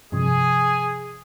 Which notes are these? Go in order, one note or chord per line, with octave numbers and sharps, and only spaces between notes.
G2 C3 F3 G#4